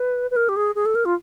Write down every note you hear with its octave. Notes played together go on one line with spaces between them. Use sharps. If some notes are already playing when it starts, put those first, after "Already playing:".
Already playing: B4
B4
A#4
G4
G#4
G#4
A4
A#4
F4